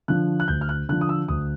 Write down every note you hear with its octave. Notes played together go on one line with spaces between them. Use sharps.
D3 F3 F#6
F#6
D2 G6
F6
F#6
D3 F3 F#6
D#6
E6
D2 D#6